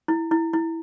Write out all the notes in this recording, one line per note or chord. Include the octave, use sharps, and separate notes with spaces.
E4
E4
E4